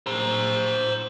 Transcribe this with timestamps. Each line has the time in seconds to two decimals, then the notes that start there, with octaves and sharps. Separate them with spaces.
0.07 C5 A#5